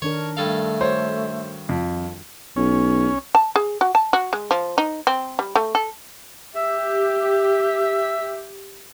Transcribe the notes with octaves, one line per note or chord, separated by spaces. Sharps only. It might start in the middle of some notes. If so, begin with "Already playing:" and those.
D#3 D4 A#4 C#5
G2 A3 A4 F5
F#4 C5 C#5
F2
B1 C#4
A5
G#4
F#4
A5
F#4
G#3
F3
D#4
C4
G3
A3
A4
G4 E5